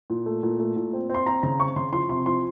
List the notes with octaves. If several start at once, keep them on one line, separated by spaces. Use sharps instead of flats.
A#2
A3
A#2
A3
A#2
C4
C4 C6
C4 A#5
C#3 A#5
C4 C#6
C#3 C6
F3 C6
C3 C6
F3 C6